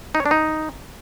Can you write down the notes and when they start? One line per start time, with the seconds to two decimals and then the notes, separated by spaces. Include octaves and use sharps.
0.15 D#4
0.20 C#5
0.26 D4
0.31 D#4